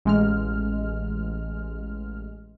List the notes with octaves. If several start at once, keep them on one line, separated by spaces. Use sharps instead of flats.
A1 G#3 F6